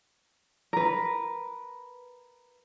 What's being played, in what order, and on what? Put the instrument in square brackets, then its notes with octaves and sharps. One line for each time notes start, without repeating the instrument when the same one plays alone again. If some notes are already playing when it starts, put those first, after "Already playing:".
[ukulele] A#4 B4